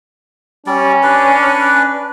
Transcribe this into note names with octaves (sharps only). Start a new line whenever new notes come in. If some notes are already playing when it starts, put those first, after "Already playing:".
G3 C#4 D5
D4 B4 D5